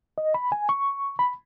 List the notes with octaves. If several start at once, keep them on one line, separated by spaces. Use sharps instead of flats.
D#5
B5
G#5
C#6
B5